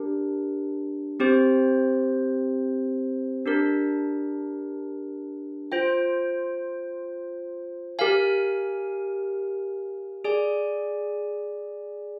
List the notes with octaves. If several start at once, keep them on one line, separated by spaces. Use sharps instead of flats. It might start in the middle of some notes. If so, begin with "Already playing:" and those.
Already playing: D4 G4 A#4
C4 G4 C5
D4 G4 A#4
F4 C5 G5
G4 A#4 F5 G#5
G#4 D5 G#5